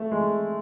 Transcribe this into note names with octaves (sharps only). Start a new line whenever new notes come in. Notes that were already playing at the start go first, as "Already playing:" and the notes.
Already playing: A3
G#3